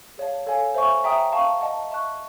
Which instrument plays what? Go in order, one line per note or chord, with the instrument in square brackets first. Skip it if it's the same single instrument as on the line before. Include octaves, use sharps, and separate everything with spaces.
[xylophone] G#4 C#5 F5 A5
A4 C#5 F5 G#5
C5 E5 G#5 C#6
E5 G5 A#5 D#6
F5 A5 C#6
D#5 F#5 A5
E5 A5 C#6 F#6